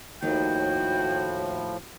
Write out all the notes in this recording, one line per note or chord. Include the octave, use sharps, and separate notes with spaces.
D#2 A2 F3 F#4 G5